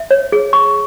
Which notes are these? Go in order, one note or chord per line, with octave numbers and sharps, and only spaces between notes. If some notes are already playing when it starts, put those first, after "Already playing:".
Already playing: E5
C#5
G#4
C#6